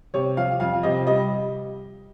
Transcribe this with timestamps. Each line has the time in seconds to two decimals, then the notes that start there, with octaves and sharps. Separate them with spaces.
0.14 C3 C#5
0.37 F3 F5
0.60 F2 F5
0.83 C3 D#5
1.07 G3 D#5